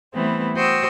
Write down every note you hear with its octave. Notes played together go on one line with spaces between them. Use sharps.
E3 G3 A3 B3 C4 E4
F#4 C5 G5 D#6 E6